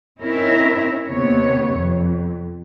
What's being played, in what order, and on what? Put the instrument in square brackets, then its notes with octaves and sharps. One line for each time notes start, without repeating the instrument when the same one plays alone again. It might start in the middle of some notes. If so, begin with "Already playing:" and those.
[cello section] C4 C#4 D#4 E4 A#4 E5
D#2 C3 B3 C#5
F2